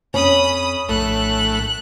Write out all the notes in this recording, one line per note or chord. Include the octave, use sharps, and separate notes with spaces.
F2 C#4 B5 D#6
A#1 A2 A3 F#6